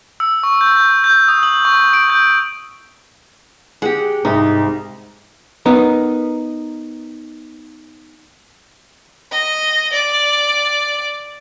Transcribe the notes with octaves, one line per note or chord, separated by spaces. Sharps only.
E6
C#6
G6
G6
G6
D#6
F#7
C#6
D7
G6
G#3 G4 F#5
C2 G#2 D#4
B3 D#4 A#4
D#5
D5